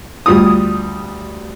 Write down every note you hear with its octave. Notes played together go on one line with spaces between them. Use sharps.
D2 G3 F4 D#6